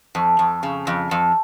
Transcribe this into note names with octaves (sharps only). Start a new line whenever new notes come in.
F2
F2
C#3
F2
F2